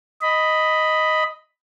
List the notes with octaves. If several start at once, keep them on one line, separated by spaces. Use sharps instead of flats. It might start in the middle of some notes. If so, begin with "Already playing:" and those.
D#5 B5